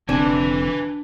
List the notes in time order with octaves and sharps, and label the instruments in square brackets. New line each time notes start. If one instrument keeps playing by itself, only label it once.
[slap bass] F1 D3 C4 [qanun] D4 [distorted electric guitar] B4 G#5